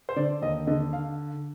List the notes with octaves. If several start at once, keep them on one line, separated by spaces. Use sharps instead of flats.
C5
D3 D5
D#2 D#5
D3 D#5
F5